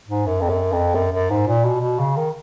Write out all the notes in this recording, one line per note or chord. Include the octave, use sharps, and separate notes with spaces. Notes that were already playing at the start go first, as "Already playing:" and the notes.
G#2
F#2
F2
F#2
F2
F#2
F#2
G#2
A#2
B2
B2
C#3
D#3